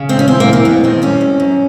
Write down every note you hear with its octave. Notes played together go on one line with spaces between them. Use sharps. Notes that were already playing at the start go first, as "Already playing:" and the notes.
Already playing: C#3
D#2 C4
C#4
E3 C4
A#3
D#2
A#3
F2 B3
D#3 C4
G3 C#4
F2
F#2